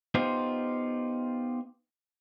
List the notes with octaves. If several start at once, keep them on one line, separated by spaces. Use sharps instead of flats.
B3 D#4 F4 G4 C5